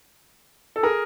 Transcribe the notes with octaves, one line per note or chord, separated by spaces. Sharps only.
A4
G#4 A#4